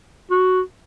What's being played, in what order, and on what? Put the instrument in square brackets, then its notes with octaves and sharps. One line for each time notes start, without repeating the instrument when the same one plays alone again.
[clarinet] F#4